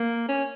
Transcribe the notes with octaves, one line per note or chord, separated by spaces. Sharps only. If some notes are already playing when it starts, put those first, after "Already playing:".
Already playing: A#3
C#4